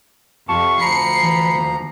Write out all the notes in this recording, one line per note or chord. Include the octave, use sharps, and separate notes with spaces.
F2 C3 G4 F5 A5 C#6
D2 F3 A#5 B5 C7 C#7
E3
D#2